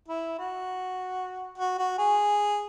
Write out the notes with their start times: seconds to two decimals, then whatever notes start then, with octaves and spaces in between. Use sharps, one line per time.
0.08 E4
0.38 F#4
1.58 F#4
1.79 F#4
1.98 G#4